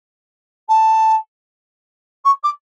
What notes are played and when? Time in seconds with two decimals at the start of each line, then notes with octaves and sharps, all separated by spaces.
0.68 A5
2.24 C#6
2.43 D6